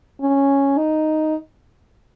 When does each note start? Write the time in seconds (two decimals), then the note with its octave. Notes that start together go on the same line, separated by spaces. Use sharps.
0.21 C#4
0.77 D#4